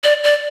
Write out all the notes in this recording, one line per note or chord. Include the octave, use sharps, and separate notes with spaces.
D5
D5